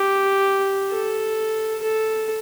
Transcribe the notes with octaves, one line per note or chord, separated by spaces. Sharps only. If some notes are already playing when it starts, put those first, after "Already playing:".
Already playing: G4
A4
A4